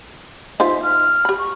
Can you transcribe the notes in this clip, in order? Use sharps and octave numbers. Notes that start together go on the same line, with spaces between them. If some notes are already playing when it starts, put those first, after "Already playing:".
D#4 F4 C5 E5
F6
G4 B5
C#6